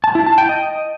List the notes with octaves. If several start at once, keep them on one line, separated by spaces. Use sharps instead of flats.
A5
E4
A5
G5
D#5